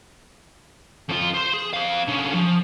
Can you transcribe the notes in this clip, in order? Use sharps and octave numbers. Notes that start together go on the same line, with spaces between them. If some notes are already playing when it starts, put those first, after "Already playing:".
F2 F4
C5 C6
G#4
C4 F5
D3 C#4
F3